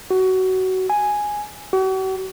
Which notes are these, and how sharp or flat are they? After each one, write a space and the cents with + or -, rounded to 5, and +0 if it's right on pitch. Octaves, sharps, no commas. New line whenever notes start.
F#4 +20
G#5 +0
F#4 +45